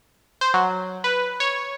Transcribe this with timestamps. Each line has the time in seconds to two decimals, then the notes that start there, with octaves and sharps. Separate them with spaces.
0.41 C5
0.54 F#3
1.04 B4
1.40 C#5